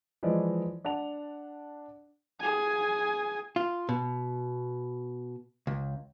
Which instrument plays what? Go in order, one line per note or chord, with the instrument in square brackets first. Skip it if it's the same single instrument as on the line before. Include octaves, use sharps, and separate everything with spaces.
[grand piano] E3 F3 G#3 D5 D#5
D4 F#5 A5 F7
[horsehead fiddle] G#4 G#5
[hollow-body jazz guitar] F4
B2
C#2